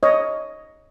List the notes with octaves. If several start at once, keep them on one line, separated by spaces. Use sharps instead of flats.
C#5 D#5